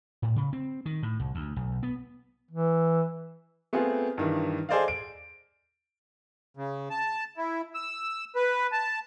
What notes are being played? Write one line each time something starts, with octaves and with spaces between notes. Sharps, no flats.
A2
C#3
C4
D#3
A2
C2
D2
B1
B3
E3
A3 B3 C4 F4 G#4
G2 D#3 E3
G#4 A4 C5 D5 D#5 F5
D7
C#3
A5
E4
E6
B4
A5